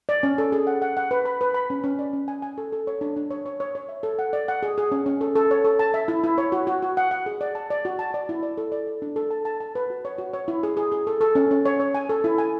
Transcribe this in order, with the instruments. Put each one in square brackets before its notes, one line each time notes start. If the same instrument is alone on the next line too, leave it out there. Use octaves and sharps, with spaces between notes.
[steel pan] D5
C#4
A4
G#4
F#5
F#5
F#5
B4
B5
B4
B5
C#4
C#4
D5
C#4
G#5
G#5
A4
A4
C#5
D4
D4
C#5
C#5
C#5
C#5
E5
A4
F#5
D5
F#5
G#4
G#4
C#4
C#4
A4
A4
C#5
A4
A5
E5
E4
E4
C#5
F#4
F#4
F#4
F#5
F#5
G#4
D5
A5
D5
F#4
A5
D5
E4
D5
A4
D5
A4
D4
A4
A5
A5
A5
B4
F#4
C#5
F#4
C#5
E4
G#4
G#4
G#4
A4
A4
C#4
C#4
C#5
C#5
G#5
A4
E4
G#5